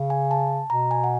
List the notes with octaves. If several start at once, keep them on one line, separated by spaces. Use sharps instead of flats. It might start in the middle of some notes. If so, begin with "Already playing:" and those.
Already playing: C#3
G#5
A5
B2 A#5
G#5
F#5